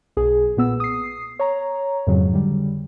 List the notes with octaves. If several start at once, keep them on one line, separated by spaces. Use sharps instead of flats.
B1 G#4
A#2 B3 E6
D#6 C7
C#5 A#5
F2 G#2 C#3 F#3
D3 G3